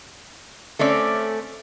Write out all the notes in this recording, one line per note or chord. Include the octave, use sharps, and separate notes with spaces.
A3 C4 C#4 D5